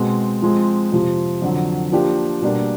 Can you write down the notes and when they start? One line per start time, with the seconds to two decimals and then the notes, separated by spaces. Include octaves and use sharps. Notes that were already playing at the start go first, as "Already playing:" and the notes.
Already playing: B2 G#3 C4
0.42 F3 G#3 C4
0.92 F2 C3 F3
1.42 F2 D3 F#3
1.92 F3 A#3 D4 G4
2.42 B2 G3 A#3 D4